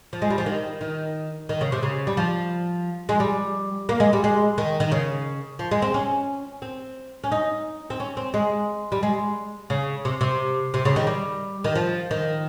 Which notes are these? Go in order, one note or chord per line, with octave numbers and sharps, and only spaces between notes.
F3
G#3
G3
F3
D#3
D#3
D#3
C#3
C3
C#3
G3
F3
G#3
G3
A#3
G#3
G3
G#3
D#3
D#3
C#3
F3
G#3
C4
C#4
C4
C#4
D#4
C4
C#4
C4
G#3
G3
G#3
C#3
C3
C3
C3
C#3
D#3
G3
D#3
F3
D#3